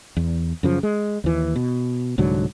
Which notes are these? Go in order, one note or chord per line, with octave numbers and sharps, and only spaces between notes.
E2
F#2 C#3 F3
G#3
D#2 E3
B2
C2 G#2 D3 F#3